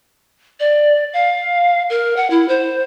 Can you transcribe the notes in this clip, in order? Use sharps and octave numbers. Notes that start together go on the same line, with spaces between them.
D5
F5
A#4
F#5
E4
C5